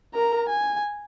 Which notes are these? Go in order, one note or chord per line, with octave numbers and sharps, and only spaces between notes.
A#4 A#5
G#5